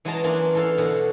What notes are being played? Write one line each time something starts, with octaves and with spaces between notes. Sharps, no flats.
E3 F#3 G#3 C#4 A5 A#5
E3 A#3 C#4 D4 F4
E3 A4 F5 F#5
B2 D3 C#4